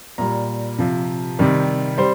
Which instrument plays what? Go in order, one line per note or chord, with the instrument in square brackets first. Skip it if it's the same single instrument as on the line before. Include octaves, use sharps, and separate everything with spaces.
[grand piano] A#2 G3 A#5
C3 F3
C3 D#3 G3
G3 C5